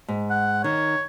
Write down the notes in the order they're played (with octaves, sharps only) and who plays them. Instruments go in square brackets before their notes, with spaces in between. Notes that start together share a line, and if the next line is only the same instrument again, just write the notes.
[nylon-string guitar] G#2
[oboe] F#5
[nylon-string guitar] D#3 [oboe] C#5